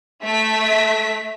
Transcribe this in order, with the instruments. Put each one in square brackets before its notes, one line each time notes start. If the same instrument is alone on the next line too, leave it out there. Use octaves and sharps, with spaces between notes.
[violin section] A3 E5 B6